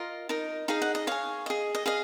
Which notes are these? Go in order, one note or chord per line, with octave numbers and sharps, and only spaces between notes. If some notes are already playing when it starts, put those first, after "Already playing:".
Already playing: F4 A#4 D#5
D#4 A#4 D#5
D#4 G#4 D#5 F5
F#5
D#5
G#4 C#5 F5
G#4 D#5
D#5
G#4 D#5 F5